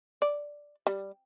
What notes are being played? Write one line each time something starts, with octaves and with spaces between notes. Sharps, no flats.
D5
G3